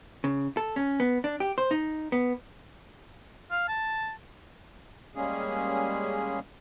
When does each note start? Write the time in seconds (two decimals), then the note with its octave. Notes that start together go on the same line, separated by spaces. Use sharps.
0.24 C#3
0.57 A4
0.76 C#4
1.00 B3
1.24 D4
1.40 G4
1.58 C5
1.71 D#4
2.12 B3
3.51 F5
3.68 A5
5.15 G3 G#3 A#3 C#4 G#4